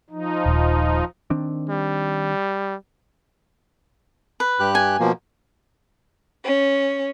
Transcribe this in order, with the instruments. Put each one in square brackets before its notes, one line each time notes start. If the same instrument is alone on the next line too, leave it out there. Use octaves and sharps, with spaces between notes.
[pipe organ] F3 D#4
[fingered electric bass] D#1
[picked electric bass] D#3 C4 D4
[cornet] G3
[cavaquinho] B4
[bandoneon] G2 G4 F#6
[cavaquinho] G#5
[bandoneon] B2 F3 A#3
[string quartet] C#4